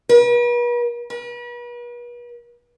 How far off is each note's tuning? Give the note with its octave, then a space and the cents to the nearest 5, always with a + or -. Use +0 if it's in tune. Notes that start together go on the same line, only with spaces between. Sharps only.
B4 -40
B4 -40